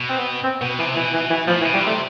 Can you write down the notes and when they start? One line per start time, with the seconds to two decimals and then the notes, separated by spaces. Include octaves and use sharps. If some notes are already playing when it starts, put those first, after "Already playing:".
Already playing: B2
0.09 C4
0.18 B3
0.44 C4
0.61 B2 B3
0.79 C3 E3
0.96 B2 E3
1.13 E3
1.30 E3
1.48 A2 F3
1.61 E3
1.65 B2
1.74 G3
1.83 C3 A3